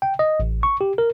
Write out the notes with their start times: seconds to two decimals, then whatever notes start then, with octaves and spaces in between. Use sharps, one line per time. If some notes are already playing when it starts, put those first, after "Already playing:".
0.02 G5
0.19 D#5
0.40 A1
0.63 C#6
0.81 G4
0.98 A#4